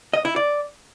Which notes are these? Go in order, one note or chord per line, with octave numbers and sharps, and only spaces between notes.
D#5
E4
D5